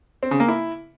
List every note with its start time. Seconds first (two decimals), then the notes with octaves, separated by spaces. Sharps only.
0.23 C4
0.31 C#3
0.40 A#3
0.48 E4